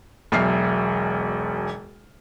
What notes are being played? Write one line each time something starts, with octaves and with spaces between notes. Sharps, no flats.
E1 B1 E5 F6 C7